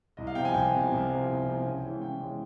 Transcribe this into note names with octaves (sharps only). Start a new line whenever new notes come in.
C2 D#5
F5
C3 F3 G5
G#5
C2 G5
C3 F3
C2
F3
C3
C2
C3 F3
C#3
E3 G#3 C#4
C#3 G5
E3 G#3 C#4